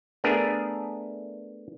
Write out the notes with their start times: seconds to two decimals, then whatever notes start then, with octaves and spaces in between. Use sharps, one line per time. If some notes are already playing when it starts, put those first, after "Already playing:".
0.24 A3 B3 D4 G#4 A#4